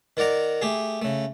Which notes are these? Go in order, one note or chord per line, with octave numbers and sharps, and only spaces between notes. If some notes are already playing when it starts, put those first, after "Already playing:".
D#3 A#4 D5 F#5 A#5
A3 G4 G#4
C#3 A3